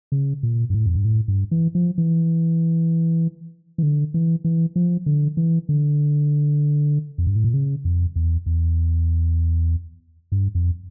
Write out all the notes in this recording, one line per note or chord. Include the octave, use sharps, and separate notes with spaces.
C#3
A#2
G2
A2
F2
G2
A2
G2
E3
F3
E3
E3
D3
E3
E3
F3
D3
E3
D3
F2
G2
A2
A#2
C#3
F2
E2
E2
G2
F2